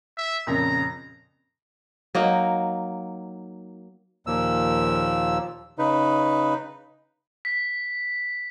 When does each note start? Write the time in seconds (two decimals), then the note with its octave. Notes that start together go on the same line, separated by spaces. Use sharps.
0.17 E5
0.47 F2 A#2 C#3 A#5
2.15 F#3 A#3 D#4
4.27 D#2 A#2 F3 A#3 E6
5.78 C#3 D#4 B4
7.45 B6